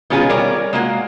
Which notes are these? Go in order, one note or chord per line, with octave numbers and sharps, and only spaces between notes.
B2 D#3 G#3 C#4 F4 G#4
G3 A#4 C#5 D5
G#3 A#3 F4 F#4